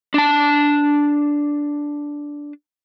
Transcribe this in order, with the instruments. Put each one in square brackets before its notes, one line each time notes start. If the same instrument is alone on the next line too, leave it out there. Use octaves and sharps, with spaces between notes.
[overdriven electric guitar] D4 A5